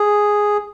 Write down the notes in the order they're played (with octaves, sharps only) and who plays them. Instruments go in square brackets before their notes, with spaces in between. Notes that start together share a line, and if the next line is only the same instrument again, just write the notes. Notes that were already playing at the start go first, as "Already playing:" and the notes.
Already playing: [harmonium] G#4